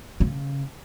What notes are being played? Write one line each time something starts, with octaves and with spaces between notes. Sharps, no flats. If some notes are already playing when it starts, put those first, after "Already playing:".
C#3